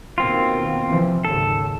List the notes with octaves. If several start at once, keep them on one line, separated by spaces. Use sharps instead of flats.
B2 D#3 A#3 C4 F4
C3 E3 F3
D#2 G#2 C#3 A4